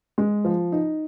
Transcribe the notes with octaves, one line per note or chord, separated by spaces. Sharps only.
G#3
F3
D#4